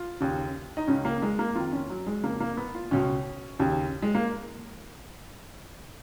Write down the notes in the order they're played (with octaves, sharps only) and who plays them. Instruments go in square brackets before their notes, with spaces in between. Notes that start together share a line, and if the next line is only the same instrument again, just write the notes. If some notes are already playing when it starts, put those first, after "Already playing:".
Already playing: [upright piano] F4
D#2 C#3
D#4
C#2 C#3 C#4
A#3
G#3
A#3
F2 D#3 F4
C#4
F#3
G#3
F2 C#3 A#3
A#3
B3
F4
C#2 B2 C#4
D#2 C#3
G#3
A#3